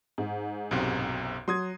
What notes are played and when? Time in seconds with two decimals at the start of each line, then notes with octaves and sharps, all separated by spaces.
0.18 G#2
0.71 B1 F#2 C3
1.48 F#3 C6 D#6 G#6